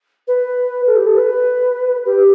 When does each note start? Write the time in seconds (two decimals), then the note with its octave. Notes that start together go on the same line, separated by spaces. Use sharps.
0.28 B4
0.87 A4
0.96 G4
1.07 A4
1.17 B4
2.06 G4